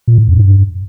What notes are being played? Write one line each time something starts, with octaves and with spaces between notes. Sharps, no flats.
A#2
A2
F2
G2